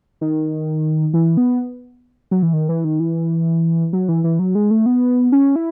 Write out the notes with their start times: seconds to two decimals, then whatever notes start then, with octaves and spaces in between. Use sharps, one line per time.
0.21 D#3
1.14 E3
1.37 B3
2.31 F#3
2.43 E3
2.53 D#3
2.69 E3
2.85 D#3
3.00 E3
3.93 F#3
4.08 E3
4.24 E3
4.39 F#3
4.55 G#3
4.71 A3
4.86 B3
5.32 C#4
5.56 E4